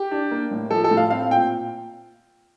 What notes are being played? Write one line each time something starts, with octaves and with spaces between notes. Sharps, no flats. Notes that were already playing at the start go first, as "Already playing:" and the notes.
Already playing: G4
D4
A#3
A2
F3 A4
A4
A2
F5
C4 F5
A#2 G5